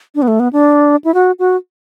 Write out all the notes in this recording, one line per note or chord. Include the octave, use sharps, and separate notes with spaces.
D4
B3
A3
B3
D4
E4
F#4
F#4